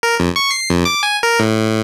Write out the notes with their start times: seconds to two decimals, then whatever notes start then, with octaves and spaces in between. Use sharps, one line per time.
0.03 A#4
0.20 F2
0.36 C#6
0.51 C7
0.70 F2
0.85 D6
1.03 G#5
1.23 A#4
1.39 A2